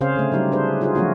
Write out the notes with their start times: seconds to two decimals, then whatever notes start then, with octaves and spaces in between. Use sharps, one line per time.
0.01 C#3 C4 C#4 G#4 C5 F5
0.16 D3 A3
0.32 F#3 G3 D#4 G4
0.52 D4 G#4 B4 C5
0.81 D#4 F4 F#4 G#4 C5
0.95 F3 F#3 A3 C#4 F4 F#4